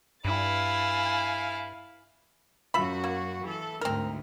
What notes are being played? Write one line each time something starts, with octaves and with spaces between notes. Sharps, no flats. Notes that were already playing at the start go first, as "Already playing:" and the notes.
G2 E4 F5 G#5 A6
F#2 F4 F#4 E5 B5
A#3
E3 A4
D2 G#2 C4 A#4